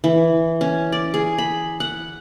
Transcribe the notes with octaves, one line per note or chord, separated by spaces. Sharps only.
E3
C#4
D5
G#4
B5
F#5